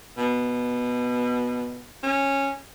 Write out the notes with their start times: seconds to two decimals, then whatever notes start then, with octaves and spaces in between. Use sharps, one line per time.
0.18 B2
2.03 C#4